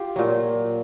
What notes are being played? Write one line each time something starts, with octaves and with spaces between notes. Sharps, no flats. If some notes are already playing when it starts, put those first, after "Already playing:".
Already playing: F4 G4
A#2 F#3